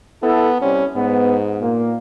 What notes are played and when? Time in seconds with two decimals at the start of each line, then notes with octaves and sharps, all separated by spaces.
0.23 B3 E4 A4
0.61 C3 G3 C#4
0.96 G#2 B3
1.61 A#2 A#3